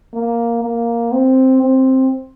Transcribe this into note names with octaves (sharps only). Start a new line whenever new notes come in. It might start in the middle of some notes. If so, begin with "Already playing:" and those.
A#3
A#3
C4
C4